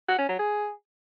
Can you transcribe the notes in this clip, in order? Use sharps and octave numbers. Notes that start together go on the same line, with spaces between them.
F#4
C#4
F#3
G#4